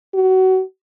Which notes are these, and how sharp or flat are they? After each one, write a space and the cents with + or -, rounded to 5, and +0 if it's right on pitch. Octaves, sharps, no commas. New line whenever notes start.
F#4 +25